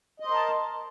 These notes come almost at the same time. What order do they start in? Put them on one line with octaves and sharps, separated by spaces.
D#5 C5 A#4 A5